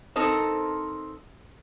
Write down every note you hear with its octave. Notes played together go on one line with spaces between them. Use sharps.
C4 D#4 A4 A#4 C5